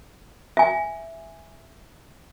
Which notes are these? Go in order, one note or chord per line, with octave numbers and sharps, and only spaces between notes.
E5 G#5